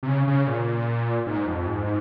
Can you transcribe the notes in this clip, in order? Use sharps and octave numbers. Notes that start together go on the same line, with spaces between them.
C3
C#3
C#3
A#2
G#2
F2
G#2